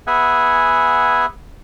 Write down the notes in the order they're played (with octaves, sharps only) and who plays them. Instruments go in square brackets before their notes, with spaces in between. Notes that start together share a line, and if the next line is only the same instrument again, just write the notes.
[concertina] B3 G#4 E5 F#5 G#5